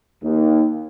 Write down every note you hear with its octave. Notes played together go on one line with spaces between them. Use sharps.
D#2